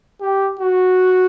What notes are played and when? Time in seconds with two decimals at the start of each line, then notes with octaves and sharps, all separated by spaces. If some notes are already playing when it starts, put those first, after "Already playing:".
0.21 G4
0.60 F#4